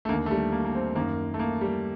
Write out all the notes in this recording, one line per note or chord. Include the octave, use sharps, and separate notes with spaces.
A3
D#2 D3 A#3
A3
G3
A#3
A#3
C4
F#2 D#3 A#3
A3
A#3
G3